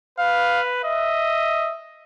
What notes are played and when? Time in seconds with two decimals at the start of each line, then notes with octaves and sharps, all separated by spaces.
0.19 B4 F5
0.85 D#5 E5